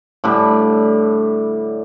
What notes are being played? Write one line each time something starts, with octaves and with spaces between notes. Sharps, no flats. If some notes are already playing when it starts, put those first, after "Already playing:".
A2 D3 G3